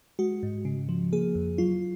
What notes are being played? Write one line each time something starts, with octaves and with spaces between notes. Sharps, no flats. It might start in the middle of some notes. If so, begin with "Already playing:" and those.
G#3 F#4
G#2
C#3
F3
A#3 G#4
F2
F#3 F4